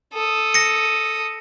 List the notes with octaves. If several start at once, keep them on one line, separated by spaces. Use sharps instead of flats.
A4 D#6
A#6 C#7